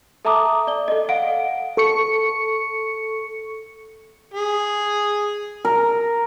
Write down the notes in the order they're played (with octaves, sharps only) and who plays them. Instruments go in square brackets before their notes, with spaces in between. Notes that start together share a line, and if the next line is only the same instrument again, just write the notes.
[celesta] A4 E5 A5 A#5 D6 D#6
D5 G7
A4 D#5
F5 F#5 D7
[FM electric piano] A4 C#6 C#7
[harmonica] G#4
[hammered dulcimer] A#4